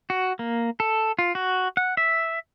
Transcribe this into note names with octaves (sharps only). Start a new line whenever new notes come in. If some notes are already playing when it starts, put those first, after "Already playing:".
F#4
A#3
A4
F4
F#4
F#5
E5